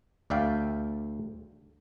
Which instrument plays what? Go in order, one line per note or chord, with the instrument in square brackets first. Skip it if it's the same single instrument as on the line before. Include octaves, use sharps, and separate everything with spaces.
[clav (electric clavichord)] D2 D5 E5 F5 G5